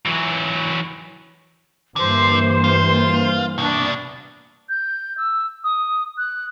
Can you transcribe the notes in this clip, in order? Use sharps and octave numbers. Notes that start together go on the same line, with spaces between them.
E3 F#3
G2 D3 E3 A#3 C5
F4
C2 B2 D4
G6
E6
D#6
F#6